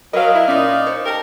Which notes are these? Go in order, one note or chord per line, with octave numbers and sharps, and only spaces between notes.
F#3 A#4 B4 D#5 F5
E4
A#2 C#4 D#4 F4 D5
C5 C#5
G4 A#4 A5